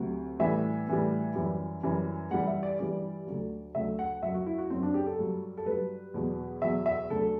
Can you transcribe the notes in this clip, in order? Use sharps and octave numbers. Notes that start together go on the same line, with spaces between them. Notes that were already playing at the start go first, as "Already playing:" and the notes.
Already playing: D2 C3 F#3
A2 E3 G3 E5
A2 E3 G3
F#2 E3 G3
F#2 E3 G3
G2 E3 G3 F#5
E5
D5
G2 E3 G3 D5
D2 D3 F#3
D2 D3 F#3 E5
F#5
F#2 F#3 E5
F#4
E4
F#4
F#2 F#3 C4
D4
G4
A4
G2 F#3
A4
G2 F#3 B4
E2 B2 F#3
E2 B2 F#3 E5
E5
D2 D3 F#3 A4